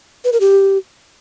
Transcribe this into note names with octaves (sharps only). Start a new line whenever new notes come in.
B4
A#4
G4